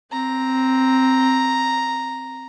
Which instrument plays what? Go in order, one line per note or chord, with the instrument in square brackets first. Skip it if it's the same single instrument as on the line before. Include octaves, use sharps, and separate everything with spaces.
[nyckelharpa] C4 [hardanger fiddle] A#5